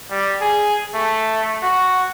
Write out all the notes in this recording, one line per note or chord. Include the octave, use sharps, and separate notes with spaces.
G3
G#4
A3
F#4